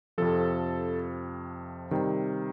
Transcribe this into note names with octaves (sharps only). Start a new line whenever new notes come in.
F2 C3 F3 A4
C3 D#3 G3